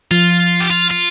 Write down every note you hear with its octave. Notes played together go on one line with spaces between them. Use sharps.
F3 F4
G4
F4
F4